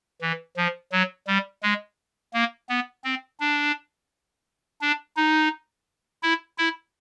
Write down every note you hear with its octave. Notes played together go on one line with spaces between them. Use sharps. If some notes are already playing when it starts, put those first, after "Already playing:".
E3
F3
F#3
G3
G#3
A#3
B3
C4
D4
D4
D#4
E4
E4